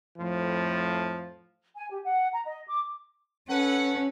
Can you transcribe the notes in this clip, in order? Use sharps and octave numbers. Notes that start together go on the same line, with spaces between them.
F2 A2 F3
G#5
G4
F#5
A#5
D#5
D6
C#4 A4 B4 F#5